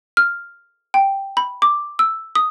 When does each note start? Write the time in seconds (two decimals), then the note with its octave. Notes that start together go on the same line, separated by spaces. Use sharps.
0.17 F6
0.94 G5
1.37 B5
1.62 D6
1.99 E6
2.35 D#6